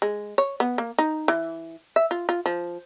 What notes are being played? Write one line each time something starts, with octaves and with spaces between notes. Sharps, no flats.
G#3
C#5
B3
A#3
D#4
E3
E5
F4
F4
F3